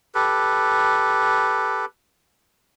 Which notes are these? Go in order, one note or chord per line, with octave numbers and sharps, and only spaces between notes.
G4 A4 B4